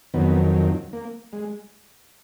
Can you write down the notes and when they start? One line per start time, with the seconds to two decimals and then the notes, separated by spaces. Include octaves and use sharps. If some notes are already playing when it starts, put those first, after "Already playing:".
0.14 F2 D#3 F#3 B3
0.93 A#3
1.33 G#3